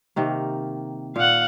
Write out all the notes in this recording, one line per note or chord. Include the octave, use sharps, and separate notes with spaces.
C3 D#3 A#3
A#2 F5 F#5